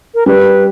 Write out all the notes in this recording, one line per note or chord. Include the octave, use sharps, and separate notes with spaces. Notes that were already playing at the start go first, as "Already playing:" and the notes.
A#4
G3 B4